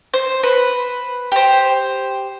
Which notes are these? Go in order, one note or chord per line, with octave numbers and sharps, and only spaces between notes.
C5
B4
G4 C5